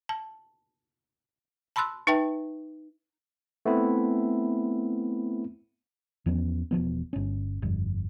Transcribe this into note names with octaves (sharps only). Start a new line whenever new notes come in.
A5
A5 B5 C6 E6 F#6
D#4 B4 E5 G5 A5
A3 B3 C4 E4
E2 F3 B3 C#4
E1 F2 F3 B3
G1 C#4
G1 F2